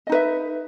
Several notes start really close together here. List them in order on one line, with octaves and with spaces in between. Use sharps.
D#5 D#4 B4 E5